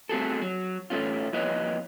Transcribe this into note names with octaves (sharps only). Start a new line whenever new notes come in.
A3 C4 F#4 G#4 A4
F#3
A2 A3 C#4 F4
F2 A#3 E4 B4 C#5 D#5